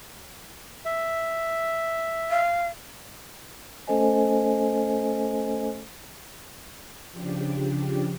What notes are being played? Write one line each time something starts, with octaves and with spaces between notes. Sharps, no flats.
E5
F5
A3 C#4 A4 C5 D#5 G#5
C#3 F3 D4 G4